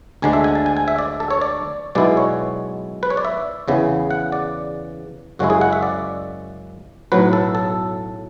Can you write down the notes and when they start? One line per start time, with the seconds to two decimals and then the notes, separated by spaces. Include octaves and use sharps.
0.22 D2 D3 G#3 D4 G#5
0.33 E5
0.44 G#5
0.55 A5
0.66 G#5
0.77 G#5
0.88 E5
0.98 D5
1.20 A4
1.31 C#5
1.41 D5
1.95 B1 B2 G#3 B3 E4 D5
2.17 C#5
3.03 B4
3.10 C#5
3.17 D5
3.25 E5
3.68 E2 C#3 E3 B3
4.11 F#5
4.32 D5
5.39 F#2 C#3 G#3 C#4 E4 F#4
5.50 G#4
5.61 F#5
5.73 E5
5.83 D5
7.12 B1 A2 F#3 B4
7.33 A4
7.55 A4